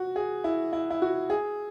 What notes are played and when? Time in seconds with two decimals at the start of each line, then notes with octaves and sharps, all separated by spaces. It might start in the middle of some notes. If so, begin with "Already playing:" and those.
Already playing: F#4
0.16 G#4
0.44 E4
0.73 E4
0.90 E4
1.02 F#4
1.30 G#4